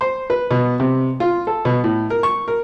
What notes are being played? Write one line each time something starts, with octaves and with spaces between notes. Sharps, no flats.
C5
B4
B2
C3
F4
A4
B2
A2
A#4
C#6
A#4